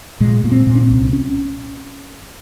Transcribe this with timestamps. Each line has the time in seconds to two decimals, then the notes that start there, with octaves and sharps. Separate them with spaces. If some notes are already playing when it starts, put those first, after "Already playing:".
0.20 A#2 G#3
0.44 A#2 A#3
0.51 C4
0.67 A#2
0.75 C#4
0.82 C4
0.90 C2
1.13 C#4